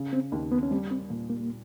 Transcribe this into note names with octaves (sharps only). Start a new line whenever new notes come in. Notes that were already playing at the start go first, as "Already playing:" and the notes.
Already playing: C#3
C4
D#2
B3
C#4
G3 C4
C4
A#2
A#3
A#3